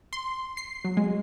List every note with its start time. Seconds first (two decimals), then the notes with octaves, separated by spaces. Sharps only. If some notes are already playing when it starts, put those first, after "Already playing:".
0.13 C6
0.57 C7
0.85 F#3
0.97 G#3